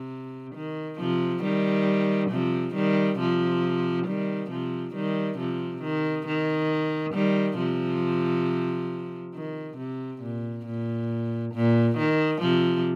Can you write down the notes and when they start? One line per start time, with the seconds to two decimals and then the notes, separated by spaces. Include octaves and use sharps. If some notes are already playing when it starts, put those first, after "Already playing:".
Already playing: C3
0.55 D#3
1.00 C3 F3
1.44 D#3 G3
2.31 C3 F3
2.75 D#3 G3
3.20 C3 F3
4.07 D#3 G3
4.51 C3 F3
4.95 D#3 G3
5.38 C3 F3
5.83 D#3
6.27 D#3
7.14 D#3 G3
7.58 C3 F3
9.35 D#3
9.78 C3
10.22 A#2
10.66 A#2
11.54 A#2
11.98 D#3
12.42 C3 F3